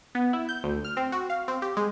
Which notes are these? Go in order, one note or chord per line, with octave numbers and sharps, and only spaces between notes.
B3
E4
G6
D2
F6
C4
F#4
F5
C4
G4
G#3